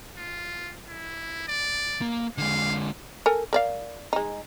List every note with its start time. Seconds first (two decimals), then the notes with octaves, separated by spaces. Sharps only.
0.17 F4
0.88 E4
1.48 D5
2.02 A#3
2.38 D3 G#3 F5
3.26 A4 A#4 G#5
3.53 A#4 D5 F5
4.13 G#3 D#4